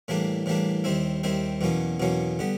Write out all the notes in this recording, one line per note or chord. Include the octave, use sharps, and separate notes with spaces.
A2 E3 G3 A#3 D4
A2 E3 G3 A#3 D4
D#2 D#3 G3 C4 E4
D#2 D#3 G3 C4 E4
E2 B2 F#3 A#3 C#4
E2 B2 F#3 A#3 C#4
D3 G3 B3